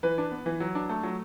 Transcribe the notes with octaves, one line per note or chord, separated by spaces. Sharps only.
E3 B4
D4
B3
E3
F#3
D4
A3
F#3